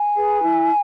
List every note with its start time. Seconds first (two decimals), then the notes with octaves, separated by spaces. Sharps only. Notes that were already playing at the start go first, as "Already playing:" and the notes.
Already playing: G#5
0.16 G#4 B4
0.43 E4